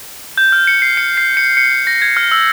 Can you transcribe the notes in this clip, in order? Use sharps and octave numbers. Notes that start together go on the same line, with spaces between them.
G6
F6
C#7
C7
C#7
C7
C#7
C#7
C#7
A#6
G#6
F6
E6